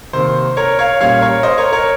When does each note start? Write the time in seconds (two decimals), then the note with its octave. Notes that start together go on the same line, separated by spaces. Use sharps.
0.13 C3 D#3 A#3 C5
0.57 A#4 C#5
0.79 C#5 F5
1.01 A#2 G3 A#3 C#4 C#5 F5
1.22 A#4 C#5
1.43 C5 D#5
1.58 A#4 C#5
1.72 A#4 C#5